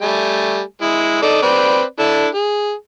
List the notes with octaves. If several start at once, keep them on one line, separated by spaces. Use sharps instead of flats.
G3 A3 G#5
G#3 E4
D#4 A4 D5
C4 B4 D5
D4 E4 A4
G#4